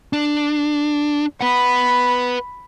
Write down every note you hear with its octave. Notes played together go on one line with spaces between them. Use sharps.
D4
B4 F#5 B5